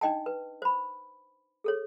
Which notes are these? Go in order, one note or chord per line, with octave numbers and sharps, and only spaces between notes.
D4 D#4 D#5 G5 A5
B4
C5 B5
G#4 A4 C#5